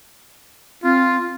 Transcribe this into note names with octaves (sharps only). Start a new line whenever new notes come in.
C4 F4